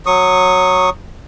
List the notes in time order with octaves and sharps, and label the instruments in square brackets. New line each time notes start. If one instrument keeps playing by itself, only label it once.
[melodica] F#3 C#6 D#6